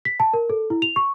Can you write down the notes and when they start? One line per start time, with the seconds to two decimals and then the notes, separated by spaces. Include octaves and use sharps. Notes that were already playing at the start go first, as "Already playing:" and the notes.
0.05 B6
0.20 A5
0.33 A#4
0.50 A4
0.70 E4
0.82 F7
0.96 C#6